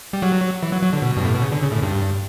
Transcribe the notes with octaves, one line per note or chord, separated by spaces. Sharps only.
G3
F#3
E3
F#3
F#3
D3
B2
G2
A2
B2
C#3
D3
C#3
A2
G2